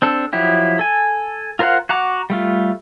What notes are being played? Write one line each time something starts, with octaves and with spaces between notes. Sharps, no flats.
C4 D4 A4
F3 F#3 E4 G4
A4 G#5
F4 A#4 C5 F5 F#5
F#4 F#5 A#5 D6
G3 A3 F4